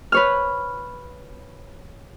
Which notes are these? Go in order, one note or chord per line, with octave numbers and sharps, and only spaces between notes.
B4 C#5 F6